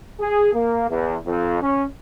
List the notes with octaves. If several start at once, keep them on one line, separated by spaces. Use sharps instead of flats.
G#4
A#3
E2
F2
C#4